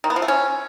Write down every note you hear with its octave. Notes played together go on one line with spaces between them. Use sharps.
D#3
B3
F3
A3
C#4